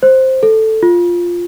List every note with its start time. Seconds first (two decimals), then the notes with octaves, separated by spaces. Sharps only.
0.03 C5
0.43 A4
0.83 F4